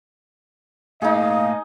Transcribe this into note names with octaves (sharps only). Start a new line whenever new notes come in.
A2 A3 A#3 D#4 G#4 D#5 F5